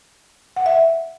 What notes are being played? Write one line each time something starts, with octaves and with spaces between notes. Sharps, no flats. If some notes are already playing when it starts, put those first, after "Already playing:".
F#5
E5